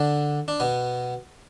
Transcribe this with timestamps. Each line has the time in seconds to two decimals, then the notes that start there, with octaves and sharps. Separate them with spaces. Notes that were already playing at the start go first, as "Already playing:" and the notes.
Already playing: D3 D4
0.48 D4
0.60 B2 B3